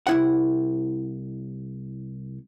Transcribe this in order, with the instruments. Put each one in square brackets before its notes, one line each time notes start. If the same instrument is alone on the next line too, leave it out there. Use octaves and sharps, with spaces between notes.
[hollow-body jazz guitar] C2 E4 F#5